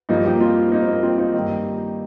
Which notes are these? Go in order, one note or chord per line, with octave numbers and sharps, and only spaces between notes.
G2 F3 A#3 D#4
D#4 G4
C4 F4
A#3 D#4
C4
A#3
C4 F4
A#3 D#4
D#3
G2